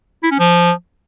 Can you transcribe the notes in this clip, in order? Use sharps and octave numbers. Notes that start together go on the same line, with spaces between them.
E4
C#4
F3